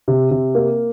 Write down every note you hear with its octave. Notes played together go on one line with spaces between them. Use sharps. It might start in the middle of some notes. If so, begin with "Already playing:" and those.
C3
C3
A#3